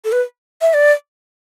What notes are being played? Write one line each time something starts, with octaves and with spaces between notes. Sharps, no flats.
A4
B4
E5
D5